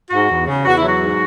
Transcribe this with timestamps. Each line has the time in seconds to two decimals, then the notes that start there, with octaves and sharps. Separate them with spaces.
0.11 G#2 F#4
0.28 E2
0.47 C#3
0.64 E2 F#4
0.77 E4
0.82 F#3
0.89 F#4
1.00 G#2